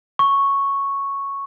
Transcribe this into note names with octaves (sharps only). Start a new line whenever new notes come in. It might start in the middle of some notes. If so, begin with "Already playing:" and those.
C#6